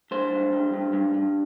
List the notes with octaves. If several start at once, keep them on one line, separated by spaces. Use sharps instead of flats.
G2 C5
G2
G2
G2
G2
G2